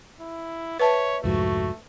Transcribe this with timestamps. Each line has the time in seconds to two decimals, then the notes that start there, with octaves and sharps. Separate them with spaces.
0.20 E4
0.80 B4 C#5 E5 A5
1.24 C2 F2 G#2 A3 F#4